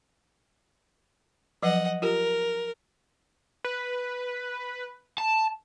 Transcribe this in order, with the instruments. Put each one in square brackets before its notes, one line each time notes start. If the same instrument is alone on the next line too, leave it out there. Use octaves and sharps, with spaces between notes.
[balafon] F3 F#3 B4 [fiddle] D#5 F#5
[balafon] F4 G4 [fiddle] A#4
[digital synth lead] B4
[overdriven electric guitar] A5